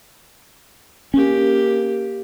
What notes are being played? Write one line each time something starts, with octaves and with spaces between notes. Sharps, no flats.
A#3 C#4 G4